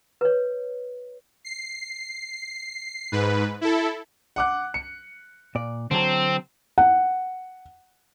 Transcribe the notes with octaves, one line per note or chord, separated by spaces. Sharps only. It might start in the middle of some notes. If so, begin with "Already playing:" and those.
B4 C#5
C7
G#2 B4
E4 A4
F#5 D6 F#6
C#7
A#2 D5
D3 F#3 C4 A5
F#5